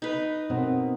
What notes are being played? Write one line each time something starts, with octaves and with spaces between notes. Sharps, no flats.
D#4 B4
B2 C4 A#4